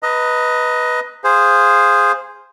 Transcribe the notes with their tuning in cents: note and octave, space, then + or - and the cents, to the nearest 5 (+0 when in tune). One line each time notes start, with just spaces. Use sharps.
B4 +0 D#5 +15 A#5 -25
G#4 -10 C5 +0 F5 +0